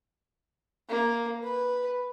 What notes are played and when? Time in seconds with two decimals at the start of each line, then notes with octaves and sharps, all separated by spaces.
0.89 A#3
1.43 B4